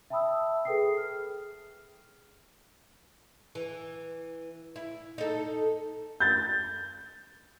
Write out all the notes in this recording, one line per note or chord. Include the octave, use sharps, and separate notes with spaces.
E5 G5 A5 B5 D#6 E6
G#4 A4 B4 G5 D#6 C7
F6
E3
E4
D#4 A4
G6 A6